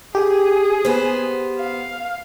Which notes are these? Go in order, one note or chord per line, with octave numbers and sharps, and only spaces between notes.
G4 G#4
B3 C5
F5